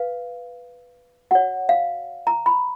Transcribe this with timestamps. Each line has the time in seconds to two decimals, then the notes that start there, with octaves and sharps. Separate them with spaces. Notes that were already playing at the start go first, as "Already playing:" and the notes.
Already playing: B4 F5
1.31 F#4 C#5 F#5
1.69 F5
2.27 A#5
2.46 B5